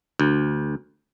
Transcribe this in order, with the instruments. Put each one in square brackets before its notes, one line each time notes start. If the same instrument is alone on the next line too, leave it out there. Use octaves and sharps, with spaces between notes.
[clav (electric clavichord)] D2